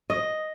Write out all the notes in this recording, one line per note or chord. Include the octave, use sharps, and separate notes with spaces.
D#5